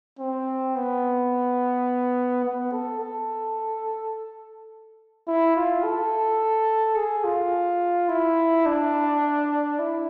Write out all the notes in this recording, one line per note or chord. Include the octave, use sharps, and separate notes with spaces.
C4
B3
B3
A4
A4
E4
F4
A4
G#4
F4
E4
D4
E4